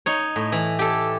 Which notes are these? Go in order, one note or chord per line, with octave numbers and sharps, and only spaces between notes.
D#4 C#5
A2
E3
G4 A4